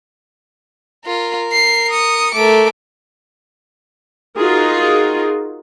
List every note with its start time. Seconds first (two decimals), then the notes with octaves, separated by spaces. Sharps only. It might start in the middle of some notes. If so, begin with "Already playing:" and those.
1.06 F4 A#4
1.52 C7
1.90 D#6 C#7
2.34 A3 A#4 D6
4.38 D#4 F4 F#4 G#4 A#4